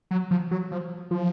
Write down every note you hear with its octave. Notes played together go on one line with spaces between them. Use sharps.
F#3
F3
F#3
F3
F3